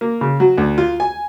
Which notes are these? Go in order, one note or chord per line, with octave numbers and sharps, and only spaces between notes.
A#3
C#3
F#3
D2
F4
G#5